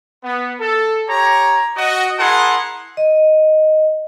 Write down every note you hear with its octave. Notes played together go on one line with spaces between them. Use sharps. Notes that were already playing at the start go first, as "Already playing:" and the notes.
B3
A4
G4 C#5 A#5
F#4 D#5
E4 G#4 A#4 F#5 A5 C6
D#5